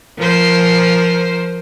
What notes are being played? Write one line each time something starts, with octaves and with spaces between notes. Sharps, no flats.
F3 A#4 C5